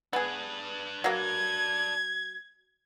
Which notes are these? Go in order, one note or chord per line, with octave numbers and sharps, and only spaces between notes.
B3 D4 G#4 B4
F#3 A#3 G#6